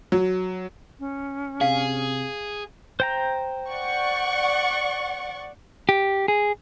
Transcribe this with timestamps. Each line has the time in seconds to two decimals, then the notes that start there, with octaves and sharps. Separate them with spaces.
0.12 F#3
1.00 C#4
1.61 C3 G#4 F5
3.00 C5 G5 A#5
3.69 D5 F#5 C#6
5.89 G4
6.28 G#4